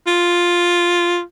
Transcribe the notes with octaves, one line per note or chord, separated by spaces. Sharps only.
F4